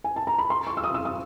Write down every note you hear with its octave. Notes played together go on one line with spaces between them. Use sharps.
G#5
A5
A#5
B5
C6
C#6
E6
D#6
E6
D#6